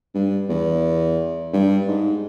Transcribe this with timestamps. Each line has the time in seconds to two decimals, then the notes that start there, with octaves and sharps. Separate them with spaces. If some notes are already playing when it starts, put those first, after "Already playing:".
0.15 G2
0.49 E2
1.53 G2
1.88 G#2